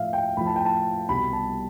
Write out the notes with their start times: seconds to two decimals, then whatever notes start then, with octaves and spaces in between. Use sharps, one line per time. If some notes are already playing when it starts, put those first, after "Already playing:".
Already playing: A2 F3 E5 F5
0.13 G5
0.37 A2 F3 B5
0.47 A5
0.56 G5
0.65 A5
1.09 C2 B2 G3 B5
1.33 A5